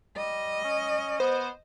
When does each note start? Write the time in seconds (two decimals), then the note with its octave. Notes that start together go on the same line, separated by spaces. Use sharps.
0.17 G3 D#5
0.64 C#4
1.20 B3 C5